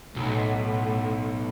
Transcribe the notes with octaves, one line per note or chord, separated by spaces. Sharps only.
B1 A2